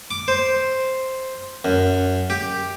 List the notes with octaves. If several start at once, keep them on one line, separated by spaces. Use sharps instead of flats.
D6
C5
F#2
G4